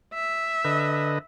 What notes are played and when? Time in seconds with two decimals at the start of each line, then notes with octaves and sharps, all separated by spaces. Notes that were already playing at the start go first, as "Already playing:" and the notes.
0.14 E5
0.65 D3 B4 D#5